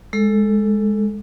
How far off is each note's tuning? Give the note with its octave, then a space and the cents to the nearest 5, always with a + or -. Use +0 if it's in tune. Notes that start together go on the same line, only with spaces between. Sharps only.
G#3 +0 A4 +0